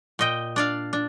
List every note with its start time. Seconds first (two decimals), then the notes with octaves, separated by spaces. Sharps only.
0.19 A#2 D#5 G5
0.56 D4 D5 F5
0.93 D4